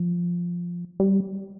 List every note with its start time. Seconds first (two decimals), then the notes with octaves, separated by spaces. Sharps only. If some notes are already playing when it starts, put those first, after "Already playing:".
Already playing: F3
1.00 G3